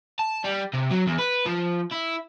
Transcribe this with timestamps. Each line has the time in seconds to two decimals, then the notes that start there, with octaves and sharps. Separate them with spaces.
0.19 A5
0.44 G3
0.74 C3
0.91 F#3
1.07 E2
1.19 B4
1.46 F3
1.92 E4